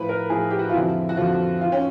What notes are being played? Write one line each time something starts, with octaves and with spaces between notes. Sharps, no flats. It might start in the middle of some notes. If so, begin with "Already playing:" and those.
Already playing: A2 F3 B4
A#4
A2 F3 G#4
G4
F#4
F4
F2 D3 F3 E4
F#4
F2 D3 F3 F4
D#3 F4
C#4